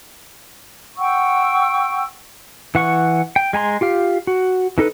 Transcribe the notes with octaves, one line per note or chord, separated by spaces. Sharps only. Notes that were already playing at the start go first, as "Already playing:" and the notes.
F#5 G5 C#6 E6
E3 F#5 C#6
G5
G#3 G#5 A#5 C6
F4 G4 F5
F#4
E3 D#4 A4 B4